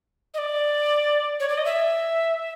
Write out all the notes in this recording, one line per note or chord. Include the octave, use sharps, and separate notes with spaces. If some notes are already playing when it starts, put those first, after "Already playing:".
D#5
D5
C#5
D5
D#5
E5